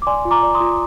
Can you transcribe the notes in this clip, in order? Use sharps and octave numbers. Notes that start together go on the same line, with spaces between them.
D6
D5 G#5 C6
F4
A#5 D6
D5
C6 D#6
F4